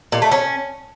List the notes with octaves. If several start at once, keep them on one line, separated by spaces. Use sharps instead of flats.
A#2
A3
C#4